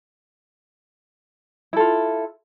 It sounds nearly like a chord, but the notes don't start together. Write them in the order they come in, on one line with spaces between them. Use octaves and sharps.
E4 A4 F4